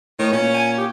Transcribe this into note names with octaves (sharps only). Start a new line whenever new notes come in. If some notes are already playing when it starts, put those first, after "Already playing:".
A2 D#3 C#5
A#2 C#4
G#5
G4